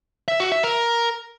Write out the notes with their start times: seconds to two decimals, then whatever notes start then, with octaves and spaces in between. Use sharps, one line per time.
0.28 E5
0.40 F#4
0.52 E5
0.64 A#4